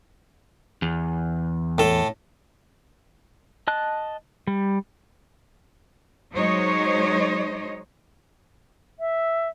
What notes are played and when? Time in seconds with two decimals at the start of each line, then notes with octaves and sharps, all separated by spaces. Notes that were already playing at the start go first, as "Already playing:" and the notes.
0.82 E2
1.78 A2 A4
3.68 D#5 A5 F#6
4.47 G3
6.35 F#3 G#3 D#4 C5 C#5 D#5
9.00 E5